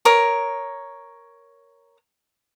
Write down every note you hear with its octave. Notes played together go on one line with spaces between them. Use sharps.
A#4 C#5 D#6